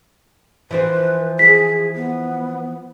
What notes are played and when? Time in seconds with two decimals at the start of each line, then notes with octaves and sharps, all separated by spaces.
0.71 E3 F3 B4 C5
1.39 G#4 B6
1.95 B3